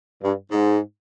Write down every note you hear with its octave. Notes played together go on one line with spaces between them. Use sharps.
G2
G#2